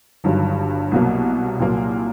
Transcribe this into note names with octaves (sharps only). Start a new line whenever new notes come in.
G1 G2 D#3 F#3
C2 B2 F#3 A#3
C2 A#2 F#3 A#3